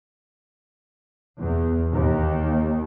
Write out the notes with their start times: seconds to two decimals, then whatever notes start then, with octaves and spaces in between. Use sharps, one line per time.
1.39 E2
1.92 D#2